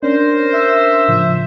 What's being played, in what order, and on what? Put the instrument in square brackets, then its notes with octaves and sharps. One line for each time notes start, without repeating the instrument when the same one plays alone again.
[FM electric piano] C#4 D4 [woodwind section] A#4 C5
[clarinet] E5
[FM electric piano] A2 C#3 F3